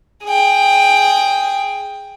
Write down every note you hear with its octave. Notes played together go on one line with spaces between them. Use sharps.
G#4 G5